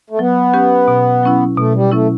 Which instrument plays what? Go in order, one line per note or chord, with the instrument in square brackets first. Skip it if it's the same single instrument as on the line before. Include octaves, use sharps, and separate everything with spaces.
[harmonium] A3
[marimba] F#3 [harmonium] B3
[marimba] C#4 G4 B4
B2
F#3 C#4 E4
[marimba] B2 [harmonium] A3
[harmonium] G3
[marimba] F#3 C#4 E4 [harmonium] A3